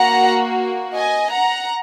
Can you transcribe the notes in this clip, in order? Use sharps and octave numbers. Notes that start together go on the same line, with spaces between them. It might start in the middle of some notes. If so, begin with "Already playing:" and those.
Already playing: A#3 F#4 F#5 A#5
D#5 G#5
F#5 A#5